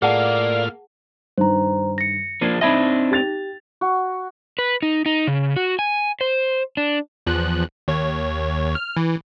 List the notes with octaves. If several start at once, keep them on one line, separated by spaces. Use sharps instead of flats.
A2 A#3 F4 G#4 D5 F5 F#5 A5
G2 D#3 C5 A#5
A#6 C#7
F3 A#3 D4 G#6 C7 D#7
C4 D4 D#4 D#5 E5 B5 G#6 A#6
G4 A6 F7
F#4
B4
D#4
D#4
C#3
F#4
G#5
C5
D4
E2 F3 F#6
D#2 C#5
F6
E3